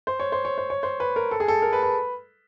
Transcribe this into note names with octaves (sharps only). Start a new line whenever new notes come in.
C5
C#5
C5
C#5
C5
C#5
C5
B4
A#4
A4
G#4
A4
A#4
B4
B4